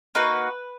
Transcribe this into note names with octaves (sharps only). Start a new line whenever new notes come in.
A#3 D#4 F#4 B4